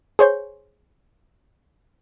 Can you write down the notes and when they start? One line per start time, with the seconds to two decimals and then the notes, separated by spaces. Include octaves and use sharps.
0.19 G#4 C5 C#5 G6